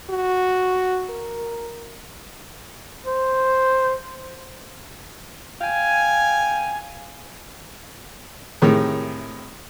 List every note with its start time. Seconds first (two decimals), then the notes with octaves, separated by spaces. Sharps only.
0.11 F#4
1.10 A#4
3.07 C5
5.61 F5 G5 G#5
8.62 A2 C3 D#3 G#3